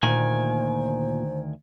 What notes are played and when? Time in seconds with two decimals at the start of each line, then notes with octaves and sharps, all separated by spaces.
0.03 D2 A#2 D#3 C5 G#5